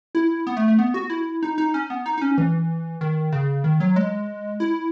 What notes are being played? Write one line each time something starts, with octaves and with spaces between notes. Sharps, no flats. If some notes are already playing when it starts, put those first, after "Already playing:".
E4
B3
A3
A3
B3
F#4
E4
D#4
D#4
C#4
B3
D#4
D#4
C#4
E3
D#3
C#3
D#3
F#3
G#3
E4